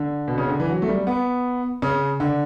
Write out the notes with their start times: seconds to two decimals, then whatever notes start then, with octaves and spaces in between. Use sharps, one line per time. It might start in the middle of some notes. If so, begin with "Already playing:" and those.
Already playing: D3
0.28 B2
0.38 C#3
0.48 D3
0.60 E3
0.70 F#3
0.82 A3
0.89 G3
1.07 B3
1.82 C#3
2.20 D3